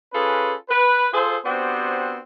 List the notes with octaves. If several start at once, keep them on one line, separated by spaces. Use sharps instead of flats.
C#4 F4 G#4 A4 B4
B4
F4 G#4 A4 C5
B3 C4 D4 F#4 G4 C5